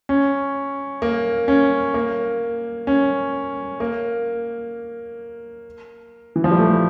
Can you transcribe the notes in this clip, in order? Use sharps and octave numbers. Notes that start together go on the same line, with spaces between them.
C#4
A#3
C#4
A#3
C#4
A#3
E3
F3
G3
A3